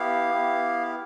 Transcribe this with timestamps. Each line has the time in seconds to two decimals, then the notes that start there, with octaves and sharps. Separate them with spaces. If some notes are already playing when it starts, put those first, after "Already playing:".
Already playing: B3 E4 G4 F5
0.34 B3 E4 G4